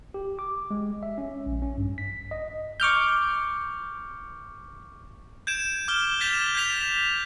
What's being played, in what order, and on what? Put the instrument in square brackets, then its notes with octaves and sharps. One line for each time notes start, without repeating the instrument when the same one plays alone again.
[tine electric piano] G4
D6
G#3
E5
C#4
A#1
C#4
G2
B6
D#5
C#6 D6 F6 G6
[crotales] G6 G#6 D7 E7
D6 F6 G7
G6 A6 B6 E7 F7 G7
G6 G#6 B6 F7